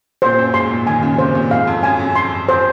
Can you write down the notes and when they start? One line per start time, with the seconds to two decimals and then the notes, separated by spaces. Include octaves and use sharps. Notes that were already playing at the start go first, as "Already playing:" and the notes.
0.22 A#2 C5
0.38 F#2
0.54 G#2 C6
0.71 A#2
0.87 D#3 G#5
1.03 C#3
1.18 C3 C5
1.35 A#2
1.51 G#2 F5
1.67 F2
1.83 F#2 G#5
1.99 F#2
2.16 C6
2.49 C5